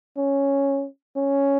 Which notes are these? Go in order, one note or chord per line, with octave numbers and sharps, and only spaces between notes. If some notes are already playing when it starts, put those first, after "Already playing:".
C#4
C#4